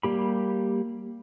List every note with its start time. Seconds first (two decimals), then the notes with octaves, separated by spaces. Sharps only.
0.03 G3 A#3 G4 B5